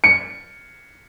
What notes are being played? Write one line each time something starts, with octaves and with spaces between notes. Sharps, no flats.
C#7